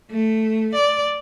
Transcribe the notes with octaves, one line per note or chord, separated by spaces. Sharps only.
A3
D5